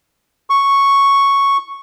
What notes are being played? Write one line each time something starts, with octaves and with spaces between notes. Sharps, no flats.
C#6